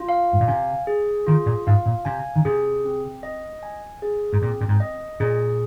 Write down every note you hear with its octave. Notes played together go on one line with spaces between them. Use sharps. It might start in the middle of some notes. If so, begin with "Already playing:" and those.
Already playing: F4
F5
G#2
A#2
C3 G#5
G#4
D#3 F4
A#2
G#2 F5
A#2
C3 G#5
D#3
C3 G#4
C4
D#5
G#5
G#4
G#2
A#2 C4
A#2
G#2
D#5
A#2 G#4